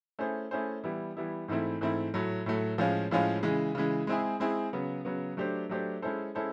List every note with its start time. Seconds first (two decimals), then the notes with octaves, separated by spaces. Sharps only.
0.19 A3 C#4 E4 G#4 C5
0.51 A3 C#4 E4 G#4 C5
0.84 E3 G3 B3 E4
1.17 E3 G3 B3 E4
1.48 G#2 E3 A3 C4 E4
1.81 G#2 E3 A3 C4 E4
2.14 A2 F#3 A3
2.46 A2 F#3 A3
2.78 A2 F3 G#3 C#4 F4
3.11 A2 F3 G#3 C#4 F4
3.43 C#3 E3 G#3
3.75 C#3 E3 G#3
4.07 G#3 C4 E4 G#4
4.40 G#3 C4 E4 G#4
4.73 C#3 F#3 B3
5.05 C#3 F#3 B3
5.37 F#3 A3 D4 G4 C5
5.69 F#3 A3 D4 G4 C5
6.02 G#3 C#4 E4 A4 C5
6.35 G#3 C#4 E4 A4 C5